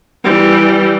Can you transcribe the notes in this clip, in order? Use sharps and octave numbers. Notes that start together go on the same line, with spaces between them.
E3 G3